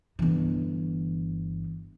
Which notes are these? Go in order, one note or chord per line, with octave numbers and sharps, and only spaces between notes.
G1 E3